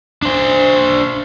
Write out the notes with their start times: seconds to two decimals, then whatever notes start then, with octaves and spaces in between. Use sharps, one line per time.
0.22 D4 C5